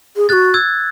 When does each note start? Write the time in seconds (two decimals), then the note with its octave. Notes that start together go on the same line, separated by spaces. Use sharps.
0.16 G#4
0.29 F#4 G#4 F#6 A6
0.54 E6 G#6